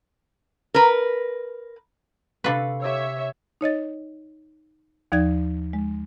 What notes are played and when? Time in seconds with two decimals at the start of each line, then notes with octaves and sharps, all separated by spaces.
0.74 A#4 B4
2.44 C3 D4 A4 B4 F5 B5 C#6
2.82 G4 C#5 E5 D6 E6
3.61 D#4 C#5 D#5 A6
5.12 D#2 F3 D#4 D5 G#6
5.73 G#3